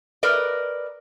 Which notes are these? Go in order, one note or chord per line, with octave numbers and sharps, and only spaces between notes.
A#4 B4 D5 D#5